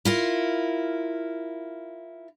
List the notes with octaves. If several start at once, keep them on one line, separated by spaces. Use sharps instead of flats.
E4 F4 A#4